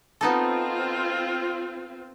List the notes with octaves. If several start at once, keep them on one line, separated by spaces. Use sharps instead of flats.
B3 C4 D#4 F4 A4